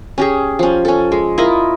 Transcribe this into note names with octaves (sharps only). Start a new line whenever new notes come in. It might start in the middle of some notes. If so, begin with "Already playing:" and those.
C#4 G4 G#4
F3 C#4
C#4 A4
G#3
E4 F4 A#4 D#5